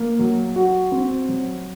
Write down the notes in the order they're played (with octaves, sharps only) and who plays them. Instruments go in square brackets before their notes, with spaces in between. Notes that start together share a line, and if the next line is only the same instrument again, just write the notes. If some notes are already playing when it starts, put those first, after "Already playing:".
Already playing: [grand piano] A#3
F#3
F#4
C4
F#3